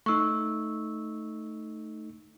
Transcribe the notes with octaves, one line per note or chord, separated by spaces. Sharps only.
A3 D#4 C#6 E6